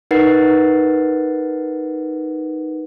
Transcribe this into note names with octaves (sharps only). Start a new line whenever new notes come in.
D#4 A#4 B4 F#5 A6 C7